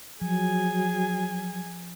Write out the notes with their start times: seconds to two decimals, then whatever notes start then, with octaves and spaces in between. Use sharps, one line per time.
0.22 F3 F#3 G#4 G#5